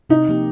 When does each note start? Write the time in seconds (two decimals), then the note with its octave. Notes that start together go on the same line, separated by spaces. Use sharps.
0.10 C3 D#4
0.28 F3 A#3 G4